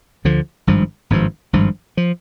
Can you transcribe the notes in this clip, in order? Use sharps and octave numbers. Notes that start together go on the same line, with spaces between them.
D2 D3 F3
G#1 G2 F3
G#1 G2 F3
G#1 G2 F3
F3